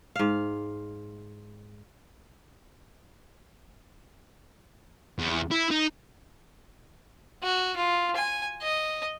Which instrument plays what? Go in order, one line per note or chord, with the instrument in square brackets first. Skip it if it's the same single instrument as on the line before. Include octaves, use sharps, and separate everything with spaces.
[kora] G#2 F5
[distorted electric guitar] E2
E4
D#4
[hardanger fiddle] F#4
F4
G#5
D#5